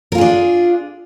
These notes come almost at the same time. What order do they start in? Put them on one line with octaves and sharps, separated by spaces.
A#4 F4 G#4 D4